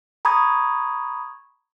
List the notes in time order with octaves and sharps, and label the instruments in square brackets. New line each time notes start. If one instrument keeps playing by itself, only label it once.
[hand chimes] A#5 B5 C#6 D#6 G#6